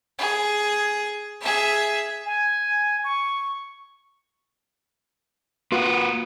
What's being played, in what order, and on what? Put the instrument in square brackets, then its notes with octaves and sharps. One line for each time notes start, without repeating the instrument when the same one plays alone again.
[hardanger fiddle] G#4
G#4 E5
[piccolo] G#5
C#6
[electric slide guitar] A#3 B4 [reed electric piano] F4 F#4 C6